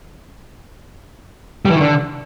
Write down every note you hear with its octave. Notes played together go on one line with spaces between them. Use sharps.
G3
E3
D#3
D3